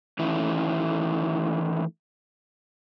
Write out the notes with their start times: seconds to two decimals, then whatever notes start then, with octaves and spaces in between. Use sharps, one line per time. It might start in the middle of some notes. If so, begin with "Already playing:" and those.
0.19 D#3 E3 A3 C#4 E4